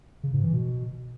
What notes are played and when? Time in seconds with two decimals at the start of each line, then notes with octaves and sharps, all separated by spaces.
0.23 C#3
0.33 G#2
0.43 E3
0.53 B2